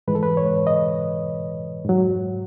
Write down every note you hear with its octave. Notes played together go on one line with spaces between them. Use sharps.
G#2 E3 G#3 B4
A4
B4
C#5
D#5
G#2 F#3